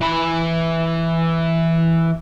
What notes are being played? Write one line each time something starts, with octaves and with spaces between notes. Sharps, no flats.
E3 B5